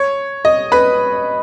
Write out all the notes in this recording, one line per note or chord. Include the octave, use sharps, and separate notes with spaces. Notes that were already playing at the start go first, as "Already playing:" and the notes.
Already playing: C#5
D#5
B4 B5